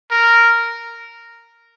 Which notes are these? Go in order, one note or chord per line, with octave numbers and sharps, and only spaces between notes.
A#4